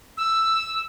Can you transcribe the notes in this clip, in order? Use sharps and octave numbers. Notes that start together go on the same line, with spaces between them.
E6